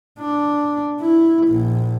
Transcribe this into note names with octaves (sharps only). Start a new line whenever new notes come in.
D4
E4
A#1